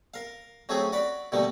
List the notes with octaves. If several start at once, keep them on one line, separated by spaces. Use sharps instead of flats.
A#4 F5
F#3 A3 C4 C#4 G#4
F#4 D5 B5
B2 D3 G3 A3 A#3